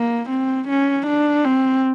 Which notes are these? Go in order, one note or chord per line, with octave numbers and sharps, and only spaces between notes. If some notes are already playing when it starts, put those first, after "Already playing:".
Already playing: A#3
C4
C#4
D4
C4